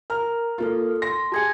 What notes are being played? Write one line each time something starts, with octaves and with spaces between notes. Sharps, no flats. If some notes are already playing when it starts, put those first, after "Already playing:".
A#4 A#5 F6
A#3 F4 A4 F6
C6 A#6
G4 G#4 G#5 A5 G#6 C#7